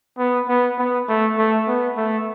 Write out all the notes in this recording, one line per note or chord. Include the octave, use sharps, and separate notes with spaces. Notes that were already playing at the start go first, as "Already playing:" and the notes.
B3
B3
B3
A3
A3
B3
A3